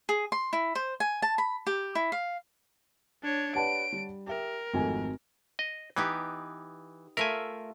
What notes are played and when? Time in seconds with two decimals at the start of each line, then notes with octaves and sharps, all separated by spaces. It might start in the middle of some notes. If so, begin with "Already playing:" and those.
0.09 G#4
0.32 C6
0.53 E4
0.75 C5
1.00 G#5
1.22 A5
1.38 B5
1.67 G4
1.95 E4
2.12 F5
3.23 D4 C#5
3.55 G4 B4 C#5 D5 F#5 A5 D7
3.92 G3
4.27 G4 A#4 E5 G5
4.74 G#1 F2 A3 F#4 G#5
5.59 D#5
5.96 E3 B3 D#4 G4
7.17 A3 F4 A#4 E5 G#5